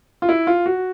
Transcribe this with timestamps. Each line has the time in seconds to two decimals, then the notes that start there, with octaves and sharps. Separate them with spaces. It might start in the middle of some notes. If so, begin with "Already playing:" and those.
0.22 F4
0.29 E4
0.47 F4
0.66 F#4